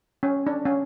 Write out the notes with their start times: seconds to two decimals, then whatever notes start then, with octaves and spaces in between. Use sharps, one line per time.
0.23 C#4
0.47 D4
0.65 C#4